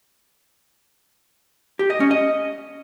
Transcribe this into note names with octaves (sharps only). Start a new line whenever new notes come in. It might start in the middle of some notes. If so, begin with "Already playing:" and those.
G4
D#5
C#4
D#5